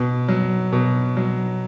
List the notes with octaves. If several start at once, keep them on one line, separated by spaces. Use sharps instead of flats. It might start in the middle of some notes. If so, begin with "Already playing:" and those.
Already playing: B2
F#3
B2
F#3